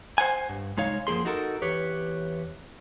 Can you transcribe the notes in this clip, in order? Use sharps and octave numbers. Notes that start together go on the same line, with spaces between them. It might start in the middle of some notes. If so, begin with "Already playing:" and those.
C5 F#5 G#5
G2
C2 G#3 D#4 C#5 F5
F#2 F3 A#3 G#4 C6
D#4 F#4 A4 A#4
E2 G4 B4 C#5